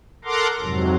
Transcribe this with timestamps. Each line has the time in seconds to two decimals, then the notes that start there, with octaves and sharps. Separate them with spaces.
0.25 A4 A#4 F#5 A#5 C6 D6
0.60 F2 G#2 C3 F#3